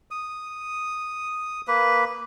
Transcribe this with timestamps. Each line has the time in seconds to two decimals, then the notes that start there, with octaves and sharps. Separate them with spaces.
0.11 D#6
1.68 A#3 B4